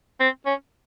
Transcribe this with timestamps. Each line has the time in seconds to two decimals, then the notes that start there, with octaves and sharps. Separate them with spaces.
0.20 C4
0.46 C#4